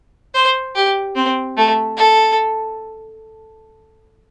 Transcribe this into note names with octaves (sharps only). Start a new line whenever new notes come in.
C5
G4
C4
A3
A4